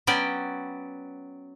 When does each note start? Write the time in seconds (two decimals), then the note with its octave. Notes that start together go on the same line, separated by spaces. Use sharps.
0.07 F#3 B3 C#4 D5 G5